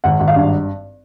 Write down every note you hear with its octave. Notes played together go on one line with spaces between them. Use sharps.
G#1 F#5
G#1
F5
G2